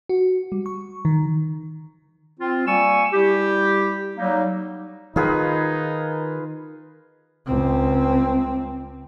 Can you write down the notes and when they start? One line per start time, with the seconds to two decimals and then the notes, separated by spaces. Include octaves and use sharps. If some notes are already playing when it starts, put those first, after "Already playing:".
0.09 F#4
0.52 G3
0.66 C#6
1.05 D#3
2.40 C4 F4
2.67 G3 A#3 G#5 C#6 E6
3.12 G3 E4 G4
4.16 F#3 G3 A#3 D#4
5.16 D#3 D#4 F4 G#4 B4
7.47 C#2 C4